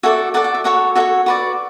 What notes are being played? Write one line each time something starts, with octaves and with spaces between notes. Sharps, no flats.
F#4 A4 D5 E5 G#5
F#4 A4 D5 F#5 A5
F#5
E5
F#4 A4 C#5 F#5
F#4 A4 C#5 E5
F#4 B4 D5